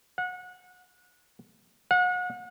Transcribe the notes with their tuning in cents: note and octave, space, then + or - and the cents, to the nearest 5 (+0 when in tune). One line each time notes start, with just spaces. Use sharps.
F#5 -25
F#5 -35